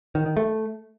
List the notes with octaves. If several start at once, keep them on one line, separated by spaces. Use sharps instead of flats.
D#3
D#3
A3